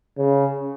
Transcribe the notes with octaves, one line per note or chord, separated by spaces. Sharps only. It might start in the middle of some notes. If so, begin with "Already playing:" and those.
C#3